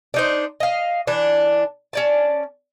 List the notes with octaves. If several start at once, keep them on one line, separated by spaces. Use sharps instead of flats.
D4 D#4 C5
D#5 F5
E3 D4
C#4 D5 A5